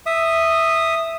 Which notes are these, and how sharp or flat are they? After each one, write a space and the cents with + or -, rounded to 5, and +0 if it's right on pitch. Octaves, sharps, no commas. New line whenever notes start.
E5 +0 D#6 -10